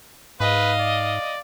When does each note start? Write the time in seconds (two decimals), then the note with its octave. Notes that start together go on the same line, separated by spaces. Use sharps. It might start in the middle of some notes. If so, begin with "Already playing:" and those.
0.40 G#2 B4 D#5 F5
0.80 D5